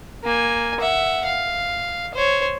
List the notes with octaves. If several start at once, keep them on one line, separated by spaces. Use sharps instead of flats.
A#3 G#5
E5 F#5
F5
C5 C#5